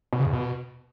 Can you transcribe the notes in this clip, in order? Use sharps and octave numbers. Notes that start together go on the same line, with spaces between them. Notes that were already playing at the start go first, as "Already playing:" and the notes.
B2
C#3
E2
B2